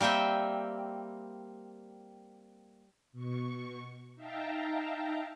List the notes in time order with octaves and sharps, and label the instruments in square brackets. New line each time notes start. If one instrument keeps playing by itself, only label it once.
[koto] G3 A#3 C4 E5 G5
[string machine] B2 C#6
D#4 E5 F5 G5 A5 A#5